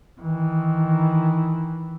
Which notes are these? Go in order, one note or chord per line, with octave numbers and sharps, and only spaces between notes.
D#3 E3